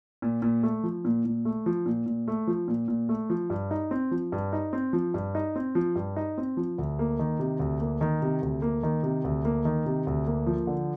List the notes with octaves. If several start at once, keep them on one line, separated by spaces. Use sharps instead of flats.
A#2
A#2
A3
F3
A#2
A#2
A3
F3
A#2
A#2
A3
F3
A#2
A#2
A3
F3
G2
D#4
C4
F3
G2
D#4
C4
F3
G2
D#4
C4
F3
G2
D#4
C4
F3
D2
A#3
D#3
C3
D2
A#3
D#3
C3
D2
A#3
D#3
C3
D2
A#3
D#3
C3
D2
A#3
F3
D3